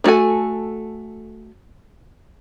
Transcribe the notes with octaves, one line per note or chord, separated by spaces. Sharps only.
D#3 A3 F#4 A4 G#5